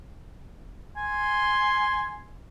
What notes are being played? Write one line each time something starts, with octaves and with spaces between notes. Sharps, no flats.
G#5 C6